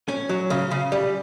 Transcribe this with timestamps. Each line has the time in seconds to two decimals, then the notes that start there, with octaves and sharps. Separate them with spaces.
0.08 C#4
0.29 F#3
0.50 C#3
0.71 C#3
0.92 G3